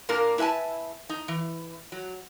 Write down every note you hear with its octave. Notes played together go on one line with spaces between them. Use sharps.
A#2 A#3 D4 A#4
E4 B4 E5 G#5 A5
D#4
E3
F#3